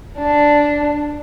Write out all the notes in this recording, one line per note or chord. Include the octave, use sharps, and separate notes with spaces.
D4